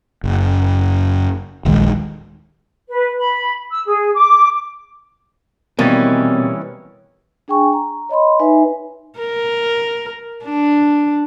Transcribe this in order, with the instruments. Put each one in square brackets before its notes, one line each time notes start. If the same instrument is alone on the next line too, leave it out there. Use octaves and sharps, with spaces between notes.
[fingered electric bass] F#1
D#1 A#1 D#3 G#3
[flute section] B4
B5
E6
G#4
D6
[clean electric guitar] B2 [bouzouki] D#3 E3 C#4 [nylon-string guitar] G3 A#3 [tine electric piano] C4 A6
[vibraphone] D4 G#4 G5 G#5 C#6
A#5
C#5 D#5 B5 C6
D#4 B4 E5 G#5
[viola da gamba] A#4
D4